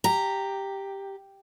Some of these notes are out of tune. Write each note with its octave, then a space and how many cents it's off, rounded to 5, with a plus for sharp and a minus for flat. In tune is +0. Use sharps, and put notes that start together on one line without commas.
G4 +0 A#5 -15